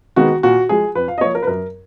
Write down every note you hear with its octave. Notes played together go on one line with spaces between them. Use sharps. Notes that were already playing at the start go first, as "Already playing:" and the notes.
D#3 G#3 B3 F#4
A#2 F#4
F3 G#3 G#4
F2 B4
F5
D#5
F3 A#3 C#5
A#4
B4
F#2 A#4